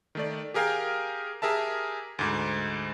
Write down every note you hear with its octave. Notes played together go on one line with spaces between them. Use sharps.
D#3 A3 D5
G4 G#4 A#4 F5 G5 G#5
G4 G#4 A#4 E5 A5
D2 G#2